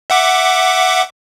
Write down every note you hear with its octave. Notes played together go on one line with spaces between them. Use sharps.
E5 F#5 D6